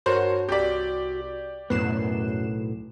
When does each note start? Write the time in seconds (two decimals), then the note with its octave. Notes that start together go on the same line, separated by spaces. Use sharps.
0.06 G2 F#4 A#4 C5 C#5 A5
0.49 C2 G4 D5 B6
1.70 B1 F#2 A2 B3 F#6 C7 E7